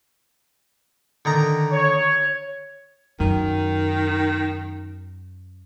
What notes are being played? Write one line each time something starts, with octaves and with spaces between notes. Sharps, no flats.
D3 D#3 A#5
C#5
F#2 D#3